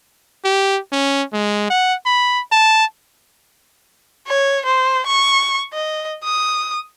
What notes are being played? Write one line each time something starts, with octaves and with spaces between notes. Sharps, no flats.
G4
C#4
G#3
F#5
B5
A5
C#5
C5
C#6
D#5
D#6